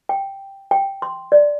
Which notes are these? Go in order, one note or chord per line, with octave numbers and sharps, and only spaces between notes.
G5
G5
C6
D5